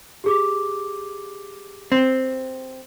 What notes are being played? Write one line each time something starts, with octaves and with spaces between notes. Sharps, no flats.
G4 G#4 D6
C4